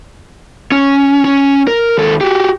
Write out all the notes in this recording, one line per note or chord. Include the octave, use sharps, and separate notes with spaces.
C#4
C#4
A#4
D#2 A4
F#4 G4